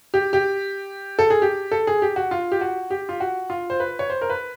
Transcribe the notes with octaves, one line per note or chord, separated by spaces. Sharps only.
G4
G4
A4
G#4
G4
A4
G#4
G4
F#4
F4
G4
F#4
G4
F4
F#4
F4
C5
B4
C#5
C5
A#4
B4